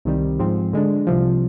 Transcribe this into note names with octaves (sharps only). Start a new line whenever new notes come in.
C2 C3 D#3 G3
G#2 F3 C4
D3 G#3 D4
C2 C3 F3